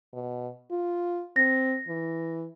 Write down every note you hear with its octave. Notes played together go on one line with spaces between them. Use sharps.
B2
F4
C4 A#6
E3